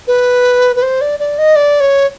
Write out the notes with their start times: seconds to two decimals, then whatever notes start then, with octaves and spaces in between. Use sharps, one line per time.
0.07 B4
0.76 B4
0.82 C5
1.01 D5
1.20 D5
1.38 D#5
1.56 D5
1.80 C#5